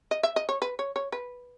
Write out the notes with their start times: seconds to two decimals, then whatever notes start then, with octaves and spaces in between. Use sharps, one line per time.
0.11 D#5
0.23 E5
0.36 D#5
0.49 C#5
0.62 B4
0.79 C#5
0.96 C#5
1.12 B4